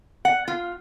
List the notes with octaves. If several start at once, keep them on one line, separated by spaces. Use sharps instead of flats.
F#5
F4